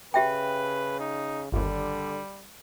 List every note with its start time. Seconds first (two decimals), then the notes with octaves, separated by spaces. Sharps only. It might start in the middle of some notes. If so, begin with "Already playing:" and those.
0.14 C#3 G4 B4 E5 G5
0.99 D#4
1.52 G1 D#2 D3 G3